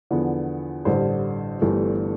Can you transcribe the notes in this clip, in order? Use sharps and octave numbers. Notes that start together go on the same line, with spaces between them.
E2 D3 F3 B3
A1 G2 D3 C5
G1 G2 E3 A3